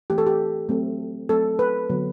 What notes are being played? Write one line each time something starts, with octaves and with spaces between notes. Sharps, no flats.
E3 A3 C4 G4
A4
G4
F#3 A3 C4
F#3 A3 C4 A4
B4
D3 F#3 B3